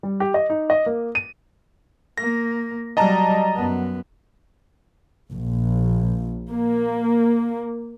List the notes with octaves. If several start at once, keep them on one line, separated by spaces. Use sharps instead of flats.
G3
G4
D#5
D#4
D#5
A#3
D#7
A#3 A#6
F#3 G3 D#5 A5 A#5
F#2 B3
A#1
A#3